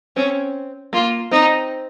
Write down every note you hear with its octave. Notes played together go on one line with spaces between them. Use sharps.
C4 C#4
A#3 F4
C4 D#4